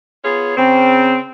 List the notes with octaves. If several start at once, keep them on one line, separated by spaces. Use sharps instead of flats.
B3 F4 G#4 C#5
C#3 C4